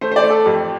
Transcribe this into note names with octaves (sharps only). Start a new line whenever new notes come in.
A3 C5
C5
D5
A3
A4
F2 G4